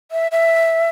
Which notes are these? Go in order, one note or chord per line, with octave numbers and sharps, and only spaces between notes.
E5
E5